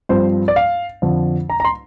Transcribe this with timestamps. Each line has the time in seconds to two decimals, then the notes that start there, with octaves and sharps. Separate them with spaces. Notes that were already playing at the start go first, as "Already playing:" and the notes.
0.09 G2 F3 C4 C5
0.48 D5
0.56 F5
1.02 F2 D3 F3
1.50 A#5
1.60 A#5
1.65 C6